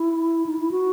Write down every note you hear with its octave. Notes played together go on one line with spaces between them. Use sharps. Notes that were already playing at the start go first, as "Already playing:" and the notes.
Already playing: E4
D#4
E4
F#4